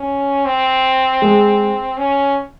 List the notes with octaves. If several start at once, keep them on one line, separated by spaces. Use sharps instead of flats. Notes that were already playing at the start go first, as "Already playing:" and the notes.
Already playing: C#4
C4
G#3
C#4